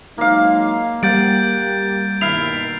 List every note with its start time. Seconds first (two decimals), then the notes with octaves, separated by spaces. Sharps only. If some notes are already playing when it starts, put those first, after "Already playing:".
0.18 F#3 G#3 A#3 D#4 F5
1.03 G3 A#3 G4 F#5 G6 A6 D7
2.21 G2 B2 D#3 E4 F6 C7 F7